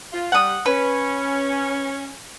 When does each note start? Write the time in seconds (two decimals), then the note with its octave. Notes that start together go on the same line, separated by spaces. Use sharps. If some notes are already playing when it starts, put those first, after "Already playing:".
0.13 F4
0.32 G3 F#5 D#6
0.66 C#4 B4